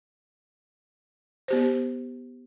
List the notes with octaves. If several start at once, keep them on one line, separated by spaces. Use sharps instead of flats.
B3 G4 C5